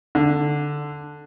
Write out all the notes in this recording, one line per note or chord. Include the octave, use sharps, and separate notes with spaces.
D3